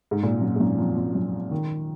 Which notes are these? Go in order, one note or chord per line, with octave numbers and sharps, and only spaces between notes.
G#2
A#2
F#2
G#2
F#2
F2
F2
F#2
D#3